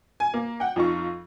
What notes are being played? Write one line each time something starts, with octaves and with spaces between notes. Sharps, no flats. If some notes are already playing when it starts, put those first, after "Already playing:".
G#5
A#3
F#5 G5
F2 D#4 F4 C#6